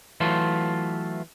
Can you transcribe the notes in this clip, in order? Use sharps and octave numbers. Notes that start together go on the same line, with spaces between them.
E3 F#3 A3 F4